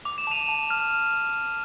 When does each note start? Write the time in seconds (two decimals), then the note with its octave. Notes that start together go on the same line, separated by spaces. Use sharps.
0.05 D6 F7
0.18 E7
0.27 A5 D#7 F7
0.48 A5
0.70 F6